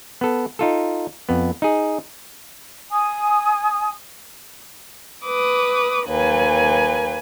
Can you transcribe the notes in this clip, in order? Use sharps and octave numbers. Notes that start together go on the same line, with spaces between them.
B3 A4
D#4 F4 A4
F2 B3
D#4 G#4
G#5 D#6
B4 D6 D#6
D#2 B4 G#5